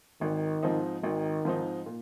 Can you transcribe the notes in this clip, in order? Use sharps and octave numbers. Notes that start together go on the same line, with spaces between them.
G#1 D#3
G#2 F3 C4 D#4
G#1 D#3
G#2 F3 C4 D#4
A#2